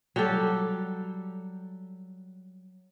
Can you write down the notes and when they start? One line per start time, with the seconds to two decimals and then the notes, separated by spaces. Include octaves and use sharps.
0.16 F#3 G3 G4 A4